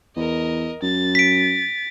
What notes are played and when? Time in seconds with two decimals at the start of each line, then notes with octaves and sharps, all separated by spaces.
0.16 E2 A#4 D#5
0.82 F#2 A6
1.15 B6 D7